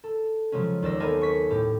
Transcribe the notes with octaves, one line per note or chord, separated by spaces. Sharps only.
A4
C#3 F3 F#3 G#3 C#4
D#2 D5 E6 A#6
B3 C4 A4 A#4 D#5 G#5
C#6 B6
A2 G4